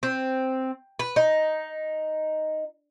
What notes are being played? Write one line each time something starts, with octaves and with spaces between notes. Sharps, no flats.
C4
B4
D#4